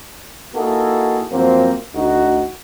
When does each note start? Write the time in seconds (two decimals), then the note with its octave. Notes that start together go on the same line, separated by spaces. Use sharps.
0.55 A#3 D#4 E4 F#4 G#4 A4
1.31 F#2 F3 F#3 A#3 C4
1.94 D2 D#4 F#4